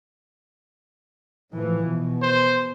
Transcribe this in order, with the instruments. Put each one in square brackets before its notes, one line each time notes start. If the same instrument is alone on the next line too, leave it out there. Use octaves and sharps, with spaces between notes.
[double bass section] A2 E3 F3
B2
[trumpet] C5